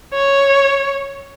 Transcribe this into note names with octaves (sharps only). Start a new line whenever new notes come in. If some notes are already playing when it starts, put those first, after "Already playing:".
C#5